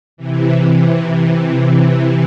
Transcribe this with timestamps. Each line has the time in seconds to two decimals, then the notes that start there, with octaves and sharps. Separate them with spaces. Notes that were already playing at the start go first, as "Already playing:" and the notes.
0.17 C3 E3
1.70 C3 E3